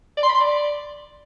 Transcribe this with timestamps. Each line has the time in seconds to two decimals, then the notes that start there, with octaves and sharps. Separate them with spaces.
0.17 D5
0.23 C6
0.29 B5
0.35 C6
0.40 D5